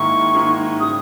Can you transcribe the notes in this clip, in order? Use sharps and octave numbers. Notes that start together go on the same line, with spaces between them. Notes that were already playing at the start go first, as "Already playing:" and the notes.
Already playing: G#2 D#3 A#3 E4 C#6
G#2 D#3 A#3 E4
C#3 G3 D#6